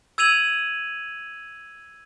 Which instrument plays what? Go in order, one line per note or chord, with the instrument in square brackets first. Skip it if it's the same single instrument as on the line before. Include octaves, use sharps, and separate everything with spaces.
[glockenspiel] E6 G#6 D#7 F7 F#7